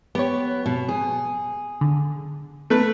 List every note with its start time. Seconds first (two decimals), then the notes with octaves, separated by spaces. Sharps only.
0.15 B3 G4 C#5
0.66 B2
0.88 G#4
1.81 D3
2.70 A3 B4